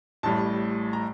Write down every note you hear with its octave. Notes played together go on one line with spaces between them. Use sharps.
A1 A2 G3 A5
A#5